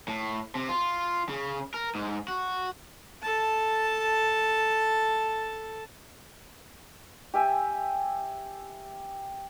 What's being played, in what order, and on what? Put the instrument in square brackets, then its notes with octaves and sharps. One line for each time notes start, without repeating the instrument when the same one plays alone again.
[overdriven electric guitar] A2
C3
F4
C#3
A#4
G#2
F#4
[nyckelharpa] A4 A5
[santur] G4 E5 G#5